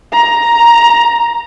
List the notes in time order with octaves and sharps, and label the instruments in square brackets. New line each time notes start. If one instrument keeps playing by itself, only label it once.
[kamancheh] A#5